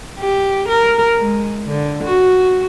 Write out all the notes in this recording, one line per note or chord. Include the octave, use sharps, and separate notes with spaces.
G4
A#4
G#3
D3
F#4